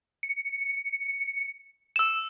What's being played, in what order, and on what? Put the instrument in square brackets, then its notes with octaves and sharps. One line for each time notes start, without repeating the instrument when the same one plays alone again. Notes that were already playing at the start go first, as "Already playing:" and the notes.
[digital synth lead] C#7
[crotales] E6 E7